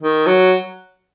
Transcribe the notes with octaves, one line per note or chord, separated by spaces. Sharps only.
D#3
F#3